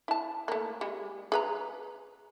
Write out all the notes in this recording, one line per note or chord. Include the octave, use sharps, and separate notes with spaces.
E4 A5
A3 A#3
G3 G#3
G#4 B4 A#5